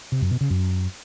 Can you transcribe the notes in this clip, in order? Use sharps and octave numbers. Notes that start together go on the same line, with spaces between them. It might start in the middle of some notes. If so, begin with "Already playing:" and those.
C3
F#2
B2
C#3
F#2